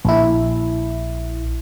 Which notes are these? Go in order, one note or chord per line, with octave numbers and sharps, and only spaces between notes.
A#1 E4